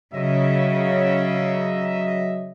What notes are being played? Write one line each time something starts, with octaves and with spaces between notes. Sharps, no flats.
C#3 F#3 D#5 E5